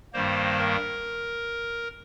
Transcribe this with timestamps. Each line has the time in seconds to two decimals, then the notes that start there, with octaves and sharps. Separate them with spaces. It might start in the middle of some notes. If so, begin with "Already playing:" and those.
0.13 G2 D#3 G3 A#3 C5
0.59 A#4